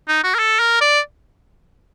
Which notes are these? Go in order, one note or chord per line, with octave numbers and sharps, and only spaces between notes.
D#4
F#4
A#4
A4
A#4
D5